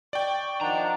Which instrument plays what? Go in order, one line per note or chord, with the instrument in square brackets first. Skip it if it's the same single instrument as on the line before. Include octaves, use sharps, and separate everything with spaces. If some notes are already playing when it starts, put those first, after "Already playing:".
[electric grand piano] D5 G5 [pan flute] C#6
[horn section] D#3 F3 D4 [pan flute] F#5 [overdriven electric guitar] A#5